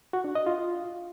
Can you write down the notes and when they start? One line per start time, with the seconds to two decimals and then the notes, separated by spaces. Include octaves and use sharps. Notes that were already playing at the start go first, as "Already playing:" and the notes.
0.13 F#4
0.24 D4
0.35 D#5
0.46 F4